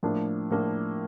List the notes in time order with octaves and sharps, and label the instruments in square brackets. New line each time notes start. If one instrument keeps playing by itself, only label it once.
[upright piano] A2 F3 A#3 D4
A2 F3 A#3 D4